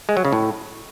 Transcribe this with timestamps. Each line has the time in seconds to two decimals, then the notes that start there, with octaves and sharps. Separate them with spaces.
0.09 G#3
0.17 F#3
0.25 C#3
0.33 A2